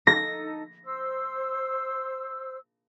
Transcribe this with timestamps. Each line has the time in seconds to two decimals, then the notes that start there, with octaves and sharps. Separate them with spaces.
0.07 D#4 A4 A#6
0.85 C5 E6